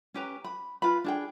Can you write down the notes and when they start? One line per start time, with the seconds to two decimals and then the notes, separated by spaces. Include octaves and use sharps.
0.14 C#4 G4 B4 A#5
0.44 B5
0.82 F4 B4 B5
1.04 D4 G#4 G5